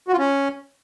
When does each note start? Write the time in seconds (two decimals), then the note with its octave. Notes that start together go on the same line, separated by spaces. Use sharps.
0.08 F#4
0.13 F4
0.19 C#4